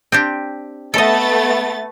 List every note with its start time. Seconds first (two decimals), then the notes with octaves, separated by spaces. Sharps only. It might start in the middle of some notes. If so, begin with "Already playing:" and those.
0.12 C4 D4 G4
0.94 A3 B3 A4 D#5 A6